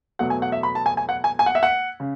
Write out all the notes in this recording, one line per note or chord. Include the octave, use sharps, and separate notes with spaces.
E2 B2 F#3 A3 F#5
G#5
F#5
E5
B5
A5
G#5
G#5
F#5
G#5
G#5
F#5
E5
F#5
C#3